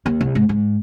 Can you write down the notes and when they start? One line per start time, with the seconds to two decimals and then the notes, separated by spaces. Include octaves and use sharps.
0.06 D#2
0.21 C2
0.35 G#2
0.49 G#2